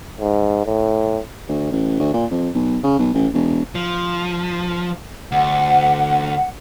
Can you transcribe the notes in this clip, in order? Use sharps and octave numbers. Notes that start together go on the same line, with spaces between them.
G#2
A2
D2
A1
D2
A#2
F2
B1
C#3
B1
A1
E1
F3
D2 F#5